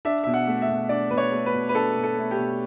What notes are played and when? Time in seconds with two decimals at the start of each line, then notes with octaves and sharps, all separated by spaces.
0.05 D4 E5
0.23 B2 E5
0.34 F#5
0.47 A3
0.62 E5
0.68 B2
0.89 D4 D5
1.10 B2 B4
1.18 C#5
1.32 A3
1.46 B4
1.53 B2
1.69 B4
1.74 D4 A4
1.96 B2
2.03 A4
2.18 A3
2.31 G4
2.38 B2